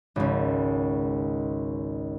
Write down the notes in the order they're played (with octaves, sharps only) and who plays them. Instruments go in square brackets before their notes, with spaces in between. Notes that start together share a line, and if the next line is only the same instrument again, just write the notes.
[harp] G#1 C#2